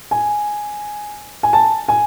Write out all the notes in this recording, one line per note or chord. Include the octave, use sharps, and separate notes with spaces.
G#5
G#5
A5
G#5